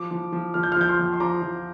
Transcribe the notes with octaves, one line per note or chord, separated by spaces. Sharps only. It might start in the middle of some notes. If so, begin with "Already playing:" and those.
Already playing: F3 D6
F3
F3
F3 F6
G6
F6
F3 G6
C6 F6
F2
C6
F3 A#5 D6
F3